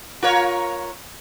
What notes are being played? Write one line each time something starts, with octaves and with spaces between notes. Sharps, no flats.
F4 A#4 C#5